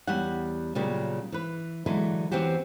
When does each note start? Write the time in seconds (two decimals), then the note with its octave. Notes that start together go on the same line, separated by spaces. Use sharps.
0.07 E2 G3 G4 C#5 F#5
0.75 A#2 C#3 F#3 G3
1.32 E3 B4
1.86 D3 E3 F#3 G#3 E4 B4
2.32 E2 E3 C4 C#4 F#4 G4